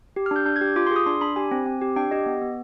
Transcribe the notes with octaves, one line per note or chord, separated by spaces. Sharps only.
G4
F6
D4 G6
D4 G6
G#6
G4
G6
F4 D6
C6
G#4
D#6
D4 C6
D4 B5
G4 G#5
C4
C4
G4
D4 G5
G4 D#5
B3
B3